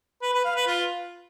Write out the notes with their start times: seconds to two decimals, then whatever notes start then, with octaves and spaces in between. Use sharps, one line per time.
0.22 B4
0.33 B4
0.44 F5
0.55 B4
0.67 F4